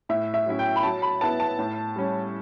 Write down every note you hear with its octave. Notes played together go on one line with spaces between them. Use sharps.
A2 E5
E5
F#3 C#4 E4
G5
B5
F#3 A5
B5
B3 E4 A5
A5
A2
G3 C#4